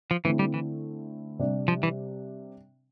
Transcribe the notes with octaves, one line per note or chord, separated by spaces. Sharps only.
F3
D3 E3 A3 C4 E4
G3
E3
C3 G3 D4
F3
E3